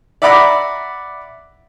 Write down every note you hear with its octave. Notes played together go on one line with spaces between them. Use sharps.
D5 E5 F#5 A#5 B5 D6